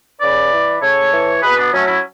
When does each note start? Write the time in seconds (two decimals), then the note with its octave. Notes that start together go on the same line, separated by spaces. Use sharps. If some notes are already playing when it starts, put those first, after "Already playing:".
0.21 C#3 B4 D5
0.52 E3
0.81 C#3 A4 C#5
1.12 E3
1.42 B2 G#4 B4
1.58 B3 D4
1.72 F#3 A3 C#4
1.87 C#4 E4